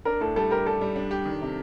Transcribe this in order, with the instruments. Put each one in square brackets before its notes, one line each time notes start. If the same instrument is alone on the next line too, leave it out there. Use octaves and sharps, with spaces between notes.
[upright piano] D4 [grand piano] A#4
[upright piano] A2 [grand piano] A4
[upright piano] G3 [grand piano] A4
[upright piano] G4 [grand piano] A#4
[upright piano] G3 [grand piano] A4
[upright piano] G3
D4
G4
D#3
C3